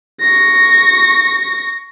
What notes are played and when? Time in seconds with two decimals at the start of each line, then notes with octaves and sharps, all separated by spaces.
0.20 C#6 A#6